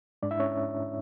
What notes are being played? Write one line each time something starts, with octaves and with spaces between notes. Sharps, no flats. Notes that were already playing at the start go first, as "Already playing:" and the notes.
G#2 G#3 D4 D5
E4 E5
C#4 C#5